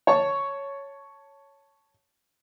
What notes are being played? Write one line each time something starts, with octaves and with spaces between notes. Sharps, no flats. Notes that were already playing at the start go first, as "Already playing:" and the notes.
C#5 A5 C#6